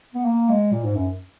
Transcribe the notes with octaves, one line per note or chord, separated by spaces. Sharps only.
B3
A#3
G#3
A#2
G#2
F#2